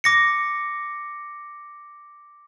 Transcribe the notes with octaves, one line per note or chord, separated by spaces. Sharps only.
D6 A#6 C#7